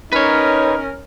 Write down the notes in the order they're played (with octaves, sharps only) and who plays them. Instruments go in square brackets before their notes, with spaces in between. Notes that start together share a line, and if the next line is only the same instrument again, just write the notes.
[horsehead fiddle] C#4 A#4 [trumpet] D#4 [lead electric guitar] B4 C#5